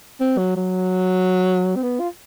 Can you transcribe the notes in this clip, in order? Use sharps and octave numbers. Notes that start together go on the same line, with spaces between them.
C4
F#3
F#3
C4
B3
F4